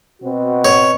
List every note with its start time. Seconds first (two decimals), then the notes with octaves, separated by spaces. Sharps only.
0.22 B2 C4 F#4
0.65 C#5